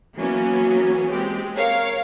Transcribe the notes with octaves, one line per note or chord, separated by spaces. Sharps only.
E3 F#3 A#3 B3 C#4
G#3 C4 G4
A#4 C#5 F5